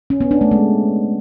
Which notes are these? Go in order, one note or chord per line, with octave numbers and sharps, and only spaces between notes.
C#4
B3
D4
A3
G#3